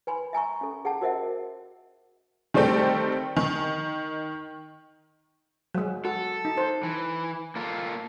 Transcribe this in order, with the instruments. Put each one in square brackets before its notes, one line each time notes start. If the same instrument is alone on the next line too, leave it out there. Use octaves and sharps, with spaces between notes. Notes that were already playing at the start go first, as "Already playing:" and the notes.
[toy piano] B4 G#5 B5 C6
E5 G#5 A#5 C#6
C#4 A4
G#4 F#5 G5 A5
F#4 A#4 C5 D#5 E5 F#5
[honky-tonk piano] D#3 G3 A3 C4 G4 A4
D#3
[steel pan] F#3 G#3
[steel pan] F#4 [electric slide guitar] A4
[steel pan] D#4
C5
[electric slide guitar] E3
A#3 F4 A4